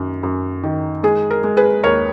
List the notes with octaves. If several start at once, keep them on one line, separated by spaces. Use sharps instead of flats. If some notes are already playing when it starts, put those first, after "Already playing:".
Already playing: F#2 D#3
F#2
D#3
G#3 G#4
A#4
G#3
G#4 B4
D#2 A#4 C#5